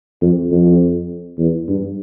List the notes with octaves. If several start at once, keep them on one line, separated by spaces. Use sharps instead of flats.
F2
F2
E2
G2